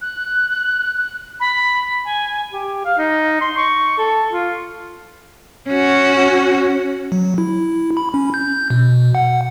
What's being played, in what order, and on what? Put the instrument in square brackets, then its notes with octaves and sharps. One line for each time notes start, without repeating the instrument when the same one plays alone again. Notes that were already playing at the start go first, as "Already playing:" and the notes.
[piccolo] F#6
B5
G#5
[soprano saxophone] G4
F5
D#4
C6
C#6
A4
F4
[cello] C#4 F#4
[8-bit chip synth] F#3
E4
B5
C#4
G6
B2
F#5